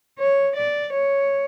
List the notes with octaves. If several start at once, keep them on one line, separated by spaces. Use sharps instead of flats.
C#5
D5
C#5